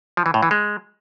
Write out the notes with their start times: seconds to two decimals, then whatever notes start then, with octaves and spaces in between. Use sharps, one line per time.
0.17 F3
0.26 E3
0.34 A2
0.43 E3
0.51 G#3